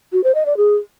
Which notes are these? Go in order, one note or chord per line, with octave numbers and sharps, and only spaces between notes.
F#4
C5
D#5
D5
G#4